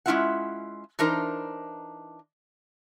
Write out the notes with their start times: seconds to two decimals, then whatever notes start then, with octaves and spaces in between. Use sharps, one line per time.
0.06 G#3 C#4 E4 F4 E5 F#5
0.99 E3 D4 D#4 A#4 C5